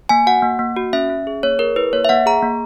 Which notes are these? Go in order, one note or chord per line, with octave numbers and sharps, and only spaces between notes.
A#3 G#5
F#4 F#5
A#3
A#3
F#4
C#4 E5
C#4
G#4
A#3 C#5
G#4 A#4
E4 B4
A#3 C#5
E5
A#3 F#5
G#4 A#5
A#3